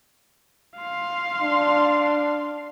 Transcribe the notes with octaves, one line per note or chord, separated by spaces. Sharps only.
F5 C6
D4